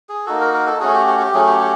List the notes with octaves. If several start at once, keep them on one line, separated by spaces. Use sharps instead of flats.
G#4
A#3 D#4 F#4 A4
A#4
A#4
A4
A3 C#4 F#4 G#4
G4
G4
G4
F#3 A3 C#4 G#4
G4
G4